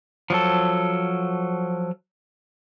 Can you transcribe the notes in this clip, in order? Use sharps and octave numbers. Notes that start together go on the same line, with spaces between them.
F3 F#3 A4